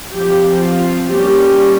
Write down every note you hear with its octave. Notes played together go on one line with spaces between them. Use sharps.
F3 C4 G4
F4
G3 A#3 C#4 G4